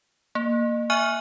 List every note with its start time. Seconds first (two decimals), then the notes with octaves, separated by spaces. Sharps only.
0.35 A#3
0.90 E5 G#5 C#6 F6 F#6 D#7